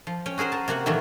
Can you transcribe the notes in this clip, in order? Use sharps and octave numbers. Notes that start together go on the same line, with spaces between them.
F3
C#4 C#5 G5
F#4 G#4 A#4 C5 F#5
A#4 A5
C3 A#3 F#4 F#5
A#2 D#3 E3 F#3 A3 A#3